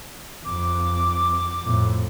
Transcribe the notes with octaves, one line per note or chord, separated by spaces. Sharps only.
F2 D6
F2 A2